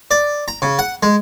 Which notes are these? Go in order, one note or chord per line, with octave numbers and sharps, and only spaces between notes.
D5
A#5
C#3
F#5
G#3